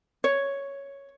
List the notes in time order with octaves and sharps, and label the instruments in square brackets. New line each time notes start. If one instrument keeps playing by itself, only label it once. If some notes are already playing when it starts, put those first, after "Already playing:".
[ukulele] C#5